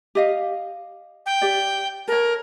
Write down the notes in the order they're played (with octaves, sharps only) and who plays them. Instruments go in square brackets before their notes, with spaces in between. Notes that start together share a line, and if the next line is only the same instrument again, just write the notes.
[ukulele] G4 D#5 F5
[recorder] G5
[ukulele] G4 D5
[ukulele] A4 C#5 [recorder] A#4